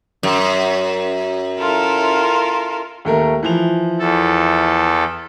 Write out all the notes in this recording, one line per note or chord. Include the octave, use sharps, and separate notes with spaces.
F#2
E4 F4 A4 A#4
D#2 A3 A#4
E3 F3 F7
E2 A4